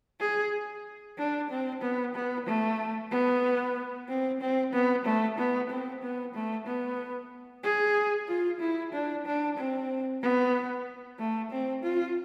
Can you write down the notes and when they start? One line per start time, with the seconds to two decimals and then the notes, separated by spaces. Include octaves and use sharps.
0.20 G#4
1.18 D4
1.50 C4
1.82 B3
2.15 B3
2.46 A3
3.11 B3
4.08 C4
4.41 C4
4.73 B3
5.05 A3
5.38 B3
5.70 C4
6.03 B3
6.34 A3
6.67 B3
7.63 G#4
8.28 F4
8.60 E4
8.93 D4
9.26 D4
9.57 C4
10.22 B3
11.19 A3
11.51 C4
11.83 F4